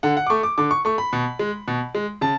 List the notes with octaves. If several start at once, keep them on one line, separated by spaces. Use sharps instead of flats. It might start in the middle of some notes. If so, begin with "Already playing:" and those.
D3 F#5
F#5
D6
A3 C#6
D6
D3 D6
C#6
A3 C#6
B5
B2
G#3
B2
G#3
C#3 A5